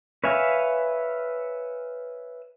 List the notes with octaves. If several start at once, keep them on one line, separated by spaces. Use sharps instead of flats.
B4 C#5 E5 F5 G#5